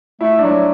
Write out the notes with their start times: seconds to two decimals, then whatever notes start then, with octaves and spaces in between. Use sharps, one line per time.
0.21 A3 E4
0.39 D4
0.44 F#3 E4